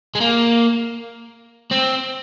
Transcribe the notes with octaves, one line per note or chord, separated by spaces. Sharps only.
G#3
A#3
C4